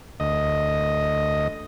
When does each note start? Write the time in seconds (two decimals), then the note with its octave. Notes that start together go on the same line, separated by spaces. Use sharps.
0.20 D2 D#5